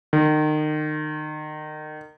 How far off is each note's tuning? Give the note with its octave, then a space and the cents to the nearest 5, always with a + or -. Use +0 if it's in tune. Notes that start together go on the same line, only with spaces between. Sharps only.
D#3 -30